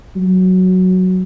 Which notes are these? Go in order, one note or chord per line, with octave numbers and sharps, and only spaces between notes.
F#3